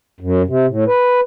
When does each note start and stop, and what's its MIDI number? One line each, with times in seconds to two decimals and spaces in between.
0.20 0.42 42
0.47 0.66 48
0.67 0.84 45
0.87 1.20 71